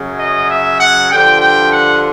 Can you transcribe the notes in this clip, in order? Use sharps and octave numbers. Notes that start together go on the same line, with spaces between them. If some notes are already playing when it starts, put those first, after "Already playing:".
Already playing: F#2 C#3 F#3
D#5
E5
F#5
G2 D3 F3 G5
G5
F#5